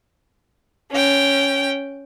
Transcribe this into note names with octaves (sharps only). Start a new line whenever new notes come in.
C#4 G5